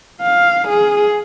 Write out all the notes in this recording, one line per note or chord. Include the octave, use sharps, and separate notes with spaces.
F5
G#4